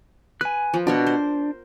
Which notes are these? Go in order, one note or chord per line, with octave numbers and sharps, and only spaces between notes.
B4 G#5 F#6
F3
B2 D4 A#4 C#5
C5